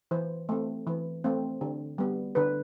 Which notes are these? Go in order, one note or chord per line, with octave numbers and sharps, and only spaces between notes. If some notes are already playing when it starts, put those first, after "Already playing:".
E3 C5
A3 C4
E3
A3 C4
D3
G3 B3
D3 B4